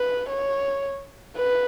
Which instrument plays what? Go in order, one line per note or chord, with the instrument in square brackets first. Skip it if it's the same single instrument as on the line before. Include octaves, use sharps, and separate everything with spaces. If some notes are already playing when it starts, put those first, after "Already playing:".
Already playing: [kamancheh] B4
C#5
B4